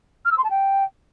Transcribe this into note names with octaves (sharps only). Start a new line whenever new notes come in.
F6
E6
C6
A5
G5